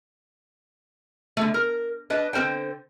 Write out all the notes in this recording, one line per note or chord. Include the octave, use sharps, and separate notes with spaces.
D3 A3
A#4
D4 B4 D#5
D3 C4 A#4 C5 G5